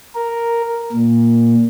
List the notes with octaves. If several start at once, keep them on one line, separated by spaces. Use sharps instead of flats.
A#4
A#2